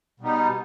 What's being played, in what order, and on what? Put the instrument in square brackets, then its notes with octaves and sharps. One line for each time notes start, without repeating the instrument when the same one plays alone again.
[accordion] B2 G3 B3 D#4